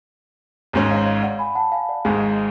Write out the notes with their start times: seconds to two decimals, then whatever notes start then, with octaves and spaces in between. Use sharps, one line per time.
0.73 G#1 G#2 G#3 C#4
0.90 C#5 F5
1.06 C#5 F5
1.23 D5 F#5
1.39 G#5 B5
1.55 F#5 A5
1.72 F5 G#5
1.89 D5 F#5
2.05 G#1 G#2 G#3 F5 G#5